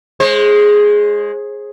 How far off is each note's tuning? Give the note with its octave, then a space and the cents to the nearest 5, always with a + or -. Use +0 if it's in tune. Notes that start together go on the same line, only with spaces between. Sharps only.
G#3 +0 C5 +40